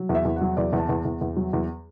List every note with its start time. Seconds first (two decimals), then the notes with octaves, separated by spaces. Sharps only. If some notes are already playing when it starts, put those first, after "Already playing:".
Already playing: F#3
0.09 E2
0.15 E5
0.25 E2
0.36 F#3 F#5
0.57 E2 D5
0.73 E2
0.78 A5
0.89 E2
1.05 E2
1.21 E2
1.36 F#3
1.53 E2